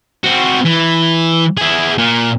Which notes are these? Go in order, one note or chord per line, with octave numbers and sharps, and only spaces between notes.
C4 F#4
E3
E4 G#4
A#2